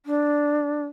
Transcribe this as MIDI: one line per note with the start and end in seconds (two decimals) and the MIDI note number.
0.06 0.85 62